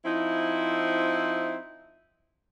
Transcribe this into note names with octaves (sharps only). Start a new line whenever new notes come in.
F3 C4 D#4 E4